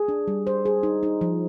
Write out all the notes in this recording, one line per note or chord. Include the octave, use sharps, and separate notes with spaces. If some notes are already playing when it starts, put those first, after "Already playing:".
Already playing: G#4
D4
G3
C5
G#4
D#4
D#4
F3